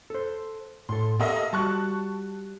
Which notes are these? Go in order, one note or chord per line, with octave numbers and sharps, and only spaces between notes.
A4 C5
A2 A4 C6
A#3 G4 A4 D#5 E5
G3 F#4 A5 C#6 F#6